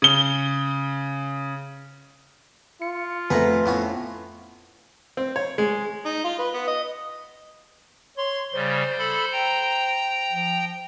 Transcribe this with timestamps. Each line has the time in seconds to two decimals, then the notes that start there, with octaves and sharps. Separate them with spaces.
0.02 C#3 G7
2.82 F4 C#7
3.30 F2 A3 G#4 B4 F#5 A#5
3.66 A2 B3 C#4
5.17 C4
5.36 C#5
5.58 G#3
6.06 D#4
6.24 F4
6.39 B4
6.54 B3
6.67 D#5
8.17 C#5 C6
8.54 C#3 G3 C5
8.98 A4 B5
9.33 G5 A#5
10.32 F3